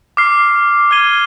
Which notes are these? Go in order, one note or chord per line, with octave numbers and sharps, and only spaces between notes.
D6 F6 C7
F6 G#6 D#7 G7